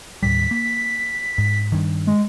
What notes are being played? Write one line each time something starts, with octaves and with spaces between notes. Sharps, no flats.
D#2 A2 G3 B6
A#3
G#2
G2 D#3
G#3